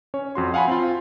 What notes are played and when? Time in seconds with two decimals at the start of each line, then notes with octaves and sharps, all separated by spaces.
0.14 C#4 C#5
0.35 F2 F#4 C6
0.54 F5 F#5 G#5 A5 B5
0.68 C4 F4